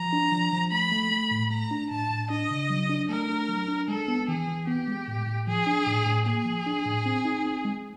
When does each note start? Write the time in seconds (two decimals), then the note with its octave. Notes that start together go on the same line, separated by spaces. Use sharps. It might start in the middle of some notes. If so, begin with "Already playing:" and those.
Already playing: F3 A#5
0.13 D4
0.32 F3
0.52 F3
0.72 A3 B5
0.92 A3
1.11 A3
1.31 A2
1.51 A3 A#5
1.71 D4
1.91 A2 A5
2.11 A2
2.30 D4 D#5
2.50 C#3
2.70 F#3
2.89 D4
3.09 A3 A#4
3.29 D4
3.49 F#3
3.68 D4
3.88 G#3 A4
4.08 B3
4.28 E3 G#4
4.47 E3
4.67 B3 G4
4.88 G#3
5.08 A2
5.27 A2
5.47 F3 G#4
5.67 D4
5.87 A2
6.06 A2
6.26 A#3 G#4
6.45 F3
6.66 D4
6.86 A2
7.06 C4
7.25 D#4
7.45 C4
7.65 G#3